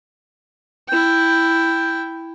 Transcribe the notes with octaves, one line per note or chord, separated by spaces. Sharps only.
E4 G5